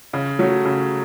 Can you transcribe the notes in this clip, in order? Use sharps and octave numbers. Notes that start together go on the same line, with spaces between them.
C#3
F#3 A3 C#4
C#3